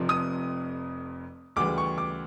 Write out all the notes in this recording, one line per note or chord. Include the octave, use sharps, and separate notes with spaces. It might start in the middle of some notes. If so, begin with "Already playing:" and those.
Already playing: F1 F2 C3 F3
D#6
D2 C#3 E3 G3 D6
C#6
D6